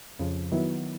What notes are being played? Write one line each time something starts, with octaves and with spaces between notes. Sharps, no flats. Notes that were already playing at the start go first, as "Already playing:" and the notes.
F2 C#3 F3
D#3 F#3 B3 E4